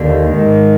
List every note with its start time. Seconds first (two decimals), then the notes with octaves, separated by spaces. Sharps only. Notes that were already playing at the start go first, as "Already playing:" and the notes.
Already playing: D#2 D3
0.29 G#2 D#3